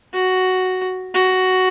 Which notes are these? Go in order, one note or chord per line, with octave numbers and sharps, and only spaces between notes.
F#4
F#4